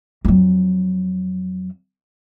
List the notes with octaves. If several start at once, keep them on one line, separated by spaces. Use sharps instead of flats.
F2 F#3